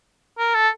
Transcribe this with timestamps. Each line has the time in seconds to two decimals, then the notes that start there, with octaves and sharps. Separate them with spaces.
0.38 A#4
0.55 A4